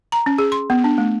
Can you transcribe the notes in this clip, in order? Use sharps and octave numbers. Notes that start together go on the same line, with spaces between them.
A#5
C#4
G#4
C6
B3
D4
A3